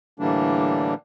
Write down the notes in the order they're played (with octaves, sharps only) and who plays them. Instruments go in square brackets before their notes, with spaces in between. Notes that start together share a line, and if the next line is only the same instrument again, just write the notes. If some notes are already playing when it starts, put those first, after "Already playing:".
[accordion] A2 D3 E3 G3 A#3 D4